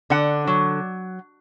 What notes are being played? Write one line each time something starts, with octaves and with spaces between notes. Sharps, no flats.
D3 F#5
F#3